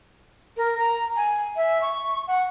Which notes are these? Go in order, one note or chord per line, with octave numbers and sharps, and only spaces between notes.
A#4
A#5
G#5
E5
C#6
F#5